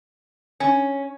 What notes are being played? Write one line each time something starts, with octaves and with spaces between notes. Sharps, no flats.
C#4